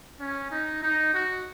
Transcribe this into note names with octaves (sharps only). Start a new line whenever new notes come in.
C#4
D#4
D#4
F#4